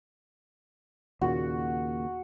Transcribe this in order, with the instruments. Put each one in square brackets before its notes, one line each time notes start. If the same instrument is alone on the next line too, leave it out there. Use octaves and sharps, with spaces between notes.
[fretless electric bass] D#2 A#2 C#3 [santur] F#4